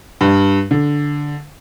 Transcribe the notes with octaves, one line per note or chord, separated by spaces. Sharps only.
G2
D3